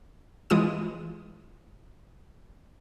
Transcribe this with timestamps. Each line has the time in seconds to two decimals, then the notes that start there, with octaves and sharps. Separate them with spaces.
0.50 E3 G#3 F4 D#6 D#7